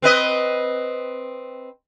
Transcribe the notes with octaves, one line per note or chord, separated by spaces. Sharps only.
C4 B4 D#5